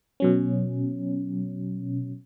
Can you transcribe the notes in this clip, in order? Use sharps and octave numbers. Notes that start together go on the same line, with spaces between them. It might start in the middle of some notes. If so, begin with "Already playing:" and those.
B2 F#3 C#4